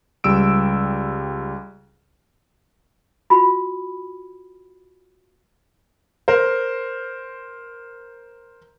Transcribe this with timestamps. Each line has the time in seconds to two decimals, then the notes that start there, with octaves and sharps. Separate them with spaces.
0.24 C#2 G3 E6 D7
3.30 F4 F#4 B5
6.28 A#4 C5